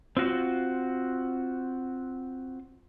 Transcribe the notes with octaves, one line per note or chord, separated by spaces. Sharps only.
C4 F4 F#4